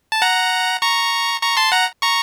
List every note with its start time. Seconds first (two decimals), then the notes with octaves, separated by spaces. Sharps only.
0.12 A5
0.22 F#5 A#5
0.82 A#5 C#6
1.42 A#5 C#6
1.57 A5 C6
1.72 F#5 A#5
2.02 A#5 C#6